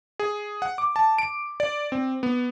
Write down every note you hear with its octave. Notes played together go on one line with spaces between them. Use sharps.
G#4
F#5
D6
A5
D7
D5
C4
B3